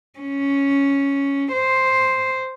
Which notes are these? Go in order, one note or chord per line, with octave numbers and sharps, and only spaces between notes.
C#4
C5